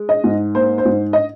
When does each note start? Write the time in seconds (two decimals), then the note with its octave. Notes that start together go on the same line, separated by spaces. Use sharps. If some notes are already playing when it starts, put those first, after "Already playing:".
Already playing: G#3
0.09 D#5
0.24 G#2
0.55 A#3 C5
0.78 C5
0.85 G#2
1.13 D#5